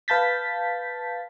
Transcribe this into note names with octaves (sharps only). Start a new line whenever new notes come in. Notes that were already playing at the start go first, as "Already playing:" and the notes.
B4 F5 A5 G6 A6 B6